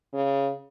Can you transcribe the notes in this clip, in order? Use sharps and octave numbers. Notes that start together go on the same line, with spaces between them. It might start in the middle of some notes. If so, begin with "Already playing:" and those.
C#3